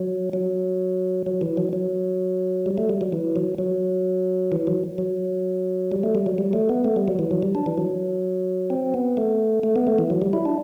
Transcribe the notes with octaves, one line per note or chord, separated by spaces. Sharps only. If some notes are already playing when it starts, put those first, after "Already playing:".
Already playing: F#3
F#3
F#3
E3
F#3
F#3
G3
A3
G3
F#3
E3
F#3
F#3
E3
F#3
F#3
G3
A3
G3
F#3
G3
A3
B3
A3
G3
F#3
E3
F#3
G3
D4
E3
F#3
C4
B3
A3
A3
B3
A3
E3
F#3
G3
E4
D4